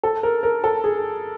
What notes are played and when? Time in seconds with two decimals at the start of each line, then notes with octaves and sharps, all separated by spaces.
0.03 A4
0.23 A#4
0.43 A#4
0.64 A4
0.84 G#4